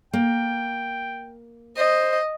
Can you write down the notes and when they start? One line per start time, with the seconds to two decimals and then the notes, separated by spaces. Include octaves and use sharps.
0.13 A#3 G5
1.77 C5 D#5